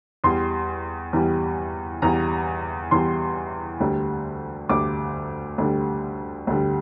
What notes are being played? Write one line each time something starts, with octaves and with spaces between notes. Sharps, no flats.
E2 E3 G3 C6
E2 E3 G3
E2 E3 G3 A#5
E2 E3 G3 C6
D2 D3 G3
D2 D3 G3 D6
D2 D3 G3
D2 D3 G3